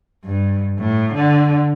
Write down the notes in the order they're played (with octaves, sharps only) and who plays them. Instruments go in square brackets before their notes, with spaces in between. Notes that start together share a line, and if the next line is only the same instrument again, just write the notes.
[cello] G2
A2
D3